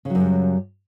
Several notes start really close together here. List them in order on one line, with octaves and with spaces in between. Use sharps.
C#3 F#3 F#2 G3